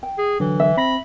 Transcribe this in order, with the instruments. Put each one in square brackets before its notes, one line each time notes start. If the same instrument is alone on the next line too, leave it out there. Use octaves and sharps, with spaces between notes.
[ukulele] G5
[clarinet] G#4
[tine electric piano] D3 F#3 [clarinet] E3
[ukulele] E5
[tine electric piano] C4 A#6 [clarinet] B5